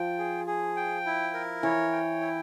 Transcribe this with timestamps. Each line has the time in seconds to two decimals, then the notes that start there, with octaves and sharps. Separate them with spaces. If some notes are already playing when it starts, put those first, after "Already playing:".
Already playing: F3 G5
0.18 G#4
0.47 G#4
0.76 G5
1.06 E4
1.34 A#4
1.63 E3 C#5
1.92 G5
2.21 E4